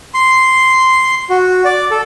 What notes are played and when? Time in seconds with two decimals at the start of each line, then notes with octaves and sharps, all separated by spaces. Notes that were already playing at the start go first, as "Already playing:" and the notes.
0.14 C6
1.30 F#4
1.65 D5
1.91 A4